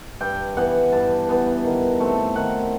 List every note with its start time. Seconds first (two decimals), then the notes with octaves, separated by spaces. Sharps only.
0.20 G2 G5
0.57 E3 B3 F#5
0.92 G2 A5
1.29 E3 B3
1.64 D#3
2.00 A3 C4
2.36 D#3 F#5